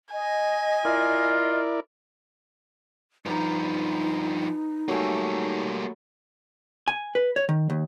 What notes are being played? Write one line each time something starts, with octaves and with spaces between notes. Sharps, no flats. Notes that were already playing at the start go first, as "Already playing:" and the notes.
D#5 G#5
E4 F4 A#4 D5
G2 F3 D#4 B4 A#5
F#3 G3 A3 A#3 G#5
G#5
B4
C#5
D#3
D#2